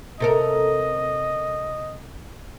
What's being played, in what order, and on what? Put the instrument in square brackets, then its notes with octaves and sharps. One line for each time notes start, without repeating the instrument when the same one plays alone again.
[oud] C3 A4 A#4 [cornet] D#5